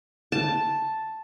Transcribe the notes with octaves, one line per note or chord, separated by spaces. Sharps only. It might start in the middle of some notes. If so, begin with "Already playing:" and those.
A5